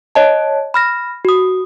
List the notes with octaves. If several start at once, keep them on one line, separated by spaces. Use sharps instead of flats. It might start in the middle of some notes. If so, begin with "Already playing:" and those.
C#5 D#5 A5
B5 F6 A#6
F#4 D#6